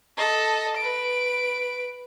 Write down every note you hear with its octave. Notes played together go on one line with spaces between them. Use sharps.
A4 D#5
B4 D7